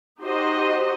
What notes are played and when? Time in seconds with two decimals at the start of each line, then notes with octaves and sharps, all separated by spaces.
0.21 D#4 F#4 G4 C5 D#5